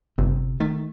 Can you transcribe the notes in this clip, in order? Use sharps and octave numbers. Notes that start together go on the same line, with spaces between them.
G1 C3
D#3 A3